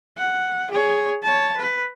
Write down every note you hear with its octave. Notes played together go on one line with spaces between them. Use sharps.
F#5
G#4 C#5
C#5 A5
B4